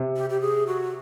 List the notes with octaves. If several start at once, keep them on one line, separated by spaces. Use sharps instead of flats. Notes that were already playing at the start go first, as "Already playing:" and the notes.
Already playing: C3
G4
G4
G#4
F#4